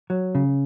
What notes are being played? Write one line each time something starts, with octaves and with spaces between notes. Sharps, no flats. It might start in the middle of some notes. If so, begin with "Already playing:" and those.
F#3
C#3